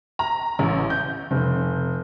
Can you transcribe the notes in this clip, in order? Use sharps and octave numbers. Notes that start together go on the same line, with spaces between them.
A#5
A1
G6
F1